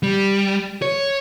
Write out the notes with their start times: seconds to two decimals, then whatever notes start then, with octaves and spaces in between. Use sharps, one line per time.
0.03 G3
0.82 C#5